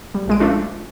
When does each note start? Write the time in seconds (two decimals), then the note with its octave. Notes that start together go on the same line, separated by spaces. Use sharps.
0.15 G3
0.28 A#1 G#3 D7
0.40 F3 G#3 A3 C#4 D4 F4